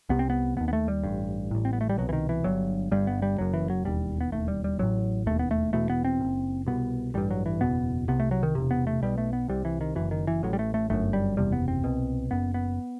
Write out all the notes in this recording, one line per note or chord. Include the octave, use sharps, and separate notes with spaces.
C2 C3 B3
C4
B3
E1 B3
D#2
B3
A3
G3
A1 G2
A1 A2
C4
B3
A3
G3
C2 B2 F#3
E3
D#3
E3
G1 G2 F#3
G1 G2 G3
B3
G3
F#1 F#2 F#3
E3
F#3
E1 D#2 G3
B3
E1 D#2 A3
G3
G3
A1 A2 F#3
E1 D#2 A3
B3
A3
E1 E2 B2 A3
B3
C4
F#2
F#1
C2 B2 B3
A1 G2 G3
F#3
E3
F#1 E2 B2 B3
C2 C3 B3
A3
F#3
D#3
E1 E2 C3
B3
A3
B1 B2 G3
A3
B3
C2 C3 G3
E3
D#3
F#1 F#2 E3
D#3
E3
A1 A2 F#3
G3
A3
A3
G1 F#2 A3
G3
F#1 E2 C3 G3
B3
C4
C2 B2
F#1 F#2 B3
B3